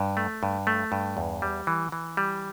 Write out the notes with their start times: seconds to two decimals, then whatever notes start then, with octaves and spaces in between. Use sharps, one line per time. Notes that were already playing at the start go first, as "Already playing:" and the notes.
Already playing: G2
0.17 A3
0.43 G2
0.67 A3
0.92 G2
1.17 E2
1.42 G3
1.67 E3
1.92 E3
2.17 G3